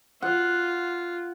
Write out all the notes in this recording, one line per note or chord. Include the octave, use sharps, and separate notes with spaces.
F4 F#5